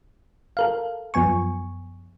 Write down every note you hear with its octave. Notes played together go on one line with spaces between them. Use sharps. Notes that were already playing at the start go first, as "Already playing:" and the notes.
A4 A#4 F5
F#2 F3 B3 G#5 C#6